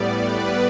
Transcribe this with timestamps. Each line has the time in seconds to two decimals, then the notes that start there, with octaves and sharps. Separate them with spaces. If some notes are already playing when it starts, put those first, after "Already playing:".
Already playing: A2 G3 B3 D5
0.24 B4